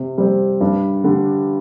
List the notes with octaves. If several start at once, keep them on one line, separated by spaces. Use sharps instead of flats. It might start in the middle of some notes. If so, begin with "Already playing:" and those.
Already playing: C3
G3 C4
G2
D3 G3